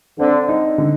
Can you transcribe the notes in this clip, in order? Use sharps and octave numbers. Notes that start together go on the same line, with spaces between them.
D3 C4
D#4
D3